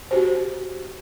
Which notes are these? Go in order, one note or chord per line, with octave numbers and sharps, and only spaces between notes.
F#4 G4 C5